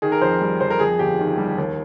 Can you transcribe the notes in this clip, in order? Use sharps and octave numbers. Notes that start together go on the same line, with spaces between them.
D#3 G#4
A#4
F2 C5
G3
F2 C5
A#4
F2 G#4
G1 G4
D#3
G3
D#2